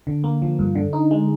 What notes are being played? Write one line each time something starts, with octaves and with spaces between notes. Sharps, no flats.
D3
A#3
F3
G2
D3
D#4
G#3